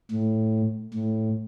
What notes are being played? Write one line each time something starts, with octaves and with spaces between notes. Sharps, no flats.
A2
A2